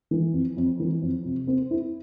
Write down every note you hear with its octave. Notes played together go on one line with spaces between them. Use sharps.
E3
F2
F2
E3
F2
C3
C4
E4